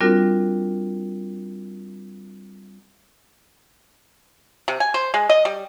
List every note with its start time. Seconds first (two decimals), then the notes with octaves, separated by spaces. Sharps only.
0.01 G3 C4 D4 F4 F#4 A#4
4.68 C3
4.80 G#5
4.94 C5
5.14 G#3
5.29 D#5
5.45 G3